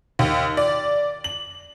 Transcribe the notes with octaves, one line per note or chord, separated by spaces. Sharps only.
D#2
D5
F#7